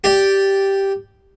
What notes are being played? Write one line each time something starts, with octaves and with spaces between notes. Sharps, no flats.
G4 D5